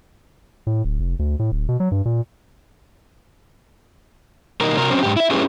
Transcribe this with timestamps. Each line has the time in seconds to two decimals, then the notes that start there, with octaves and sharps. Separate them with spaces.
0.67 A2
0.84 D1
1.00 F1
1.19 D2
1.39 A2
1.52 D1
1.69 B2
1.80 F#3
1.91 G2
2.05 A#2
4.61 B2 D#3 G3 A#3 D#4 A#4
4.78 C3 F#4 A#4
4.90 F#3 C4 C#4
5.03 G#2 G4
5.17 E4 E5
5.31 A3 C#4 E4 G4 G#4 B4